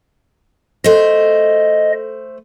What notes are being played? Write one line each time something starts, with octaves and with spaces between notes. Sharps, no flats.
A3 C5 D#5